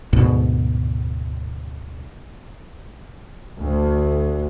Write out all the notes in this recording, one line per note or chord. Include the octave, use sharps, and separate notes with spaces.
D2 G#2 B2
D2